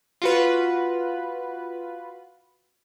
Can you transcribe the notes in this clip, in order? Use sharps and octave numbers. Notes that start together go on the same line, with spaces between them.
F4 F#4 B4